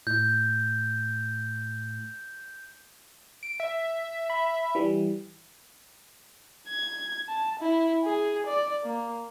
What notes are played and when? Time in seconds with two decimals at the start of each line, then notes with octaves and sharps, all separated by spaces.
0.07 A2 G6
3.43 D7
3.60 E5
4.30 B5
4.75 E3 G3
6.68 G#6
7.28 A5
7.59 E4
8.04 G#4
8.46 D5
8.84 A#3